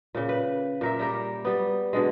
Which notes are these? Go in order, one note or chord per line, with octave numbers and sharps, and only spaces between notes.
A#2 C#3
B4
A#2 A#4 E5
G3 G4 A#4
G3 B3
B2 D3 G#3